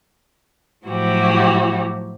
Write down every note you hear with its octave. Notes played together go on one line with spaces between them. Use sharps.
A2 F3 F#3 E4 F#4 G4